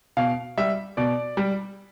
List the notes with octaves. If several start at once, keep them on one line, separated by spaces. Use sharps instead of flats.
B2 F5
G3 E5
B2 D5
G3